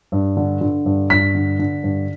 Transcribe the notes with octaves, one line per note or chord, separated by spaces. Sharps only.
G2
D3
D3
G2
G2 B6
D3
D3
G2